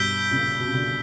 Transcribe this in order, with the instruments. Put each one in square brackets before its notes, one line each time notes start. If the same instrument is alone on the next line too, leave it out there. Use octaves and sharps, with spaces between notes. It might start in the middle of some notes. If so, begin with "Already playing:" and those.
Already playing: [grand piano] G2 B2 [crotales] E6 G6 B6 D7 G7
[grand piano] A#2 C#3
B2
C#3
B2 D3